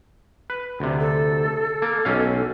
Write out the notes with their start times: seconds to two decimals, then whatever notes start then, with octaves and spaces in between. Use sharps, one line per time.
0.50 B4
0.80 D2 C3
1.00 A4
1.82 A#3
2.05 B1 C#4 F5